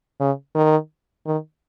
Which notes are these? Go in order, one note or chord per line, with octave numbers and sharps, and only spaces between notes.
C#3
D#3
D#3